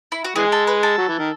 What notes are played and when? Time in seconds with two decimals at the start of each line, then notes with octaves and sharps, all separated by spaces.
0.12 E4
0.24 F#4
0.36 E3 G#3 G#4
0.52 A4
0.67 B4
0.83 A4
0.98 F#3
1.09 E3
1.19 D#3